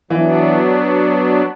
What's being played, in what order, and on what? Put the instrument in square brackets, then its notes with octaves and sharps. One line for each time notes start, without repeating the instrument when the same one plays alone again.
[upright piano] E3 [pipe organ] F#3 B3 D4